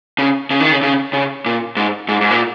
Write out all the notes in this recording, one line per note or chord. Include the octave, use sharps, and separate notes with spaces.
C#3
C#3
D#3
C#3
C#3
C#3
A#2
G#2
G#2
G#2
A#2